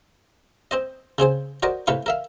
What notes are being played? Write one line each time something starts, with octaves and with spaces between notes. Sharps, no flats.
C4 C5 D#5
C#3 C4 G#4 C5
F#4 A#4 C5 D5 D#5
A2 C3 B4 F5 C#6
A#4 E5 F5